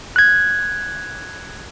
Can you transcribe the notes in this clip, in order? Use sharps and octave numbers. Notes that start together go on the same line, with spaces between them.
F#6 G#6